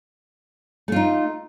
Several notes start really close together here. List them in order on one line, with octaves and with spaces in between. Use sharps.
A3 F4 D#4